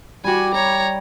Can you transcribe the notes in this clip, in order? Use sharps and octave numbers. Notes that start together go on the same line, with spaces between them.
G3 F#4 G4 G#5
C#5 A#5